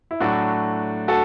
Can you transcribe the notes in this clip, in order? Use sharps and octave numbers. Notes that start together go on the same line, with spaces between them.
E4
A2 F#3 A3 D4 F#4
F#4 A4